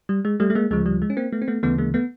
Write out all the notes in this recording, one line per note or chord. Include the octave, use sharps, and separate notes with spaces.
G3
G#3
G3 A3
A3
G#3 A#3
D2 C#3 F3 G#3
G3
G#3
C#4
A#3 C4
A3 B3
C4
A3 B3
D2 C#3 E3 A3 B3
G#3 A#3
A3 B3